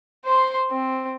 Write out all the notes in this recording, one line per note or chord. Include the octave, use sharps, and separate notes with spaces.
C5 C6
C4